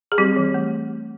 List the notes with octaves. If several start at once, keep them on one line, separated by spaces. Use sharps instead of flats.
G#4
G3 C4 G4
E3
A3